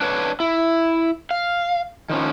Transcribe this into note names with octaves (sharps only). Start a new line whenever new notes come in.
D4 B4 C#5
E4
F5
D#3 F3 C#4